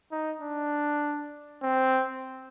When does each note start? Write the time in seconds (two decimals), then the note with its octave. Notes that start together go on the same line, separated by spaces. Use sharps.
0.12 D#4
0.42 D4
1.63 C4